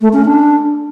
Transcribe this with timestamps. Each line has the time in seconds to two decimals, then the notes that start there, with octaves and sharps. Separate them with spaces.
0.01 A3
0.13 C#4
0.25 D4